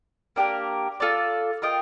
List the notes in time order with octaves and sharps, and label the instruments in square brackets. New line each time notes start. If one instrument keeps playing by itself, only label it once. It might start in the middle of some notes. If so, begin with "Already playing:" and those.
[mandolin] A#3 D4 G4 A#4
F4 A4 D5 A5
F4 A#4 D#5 G5